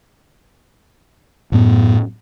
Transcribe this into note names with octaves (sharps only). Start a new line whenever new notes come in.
F#2 A2 B3